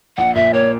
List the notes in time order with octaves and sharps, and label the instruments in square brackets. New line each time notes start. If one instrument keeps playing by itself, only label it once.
[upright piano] A#1 [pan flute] F#5
[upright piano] A#2 [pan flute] E5
[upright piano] A#3 [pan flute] C#5